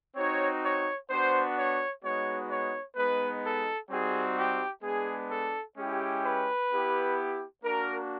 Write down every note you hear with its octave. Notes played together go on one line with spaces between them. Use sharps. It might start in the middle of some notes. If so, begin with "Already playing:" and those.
C4 D#4 F#4 C#5
C#5
B3 D4 F#4 C5
C#5
G#3 B3 D#4 F#4 C#5
C#5
G#3 B3 D#4 B4
A4
G3 C4 D#4 F#4 G#4
G4
G#3 B3 D4 G#4
A4
G#3 C#4 E4 G4
B4
B3 E4 G4
A#3 D4 F#4 A#4